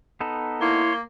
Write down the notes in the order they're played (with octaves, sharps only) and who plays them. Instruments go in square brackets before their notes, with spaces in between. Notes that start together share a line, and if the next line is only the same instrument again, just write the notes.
[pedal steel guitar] B3 D#4 A4
[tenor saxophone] A#3 [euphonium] E4 [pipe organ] C#5 C6